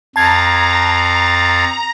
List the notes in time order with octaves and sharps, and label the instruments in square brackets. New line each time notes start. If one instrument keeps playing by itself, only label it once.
[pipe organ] F2 F5 A6 [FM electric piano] A5 G#6 [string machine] A#5